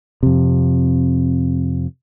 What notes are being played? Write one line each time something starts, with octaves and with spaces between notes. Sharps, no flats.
F2 C3